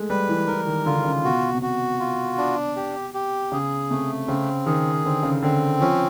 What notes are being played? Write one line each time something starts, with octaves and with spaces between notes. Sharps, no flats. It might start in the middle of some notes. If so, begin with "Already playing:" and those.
Already playing: G#3 A3
G3 B4
E3
E3 A#4
D#3
D3 F4
D3
C#3
B2 F#4
C3
B2 F#4
F4
D4
G4
G4
C#3 G#4
C3 A3
C#3 C4
D#3 G#4
D3 C4
C#3
D3 C4
F3 C#4